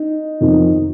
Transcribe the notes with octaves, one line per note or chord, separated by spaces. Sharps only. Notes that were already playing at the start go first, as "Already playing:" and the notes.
Already playing: D#4
F2 D#3